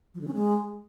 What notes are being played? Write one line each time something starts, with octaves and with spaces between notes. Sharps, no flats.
F3
D3
C#4
G#3